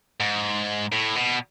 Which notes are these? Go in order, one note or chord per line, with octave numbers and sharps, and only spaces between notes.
G#2
A2
B2